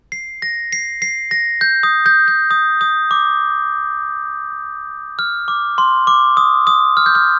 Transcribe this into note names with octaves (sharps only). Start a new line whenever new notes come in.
C7
A#6
C7
C7
A#6
G6
D#6
G6
G6
D#6
D#6
D6
F6
D6
C6
D6
D#6
D#6
F6
G6
F6